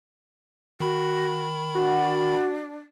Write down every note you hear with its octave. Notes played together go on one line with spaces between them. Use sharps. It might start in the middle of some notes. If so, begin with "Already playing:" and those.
D#3 F#4 B5
D4 F#4